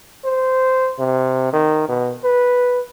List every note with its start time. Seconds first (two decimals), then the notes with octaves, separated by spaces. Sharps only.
0.25 C5
0.99 C3
1.53 D#3
1.89 B2
2.24 B4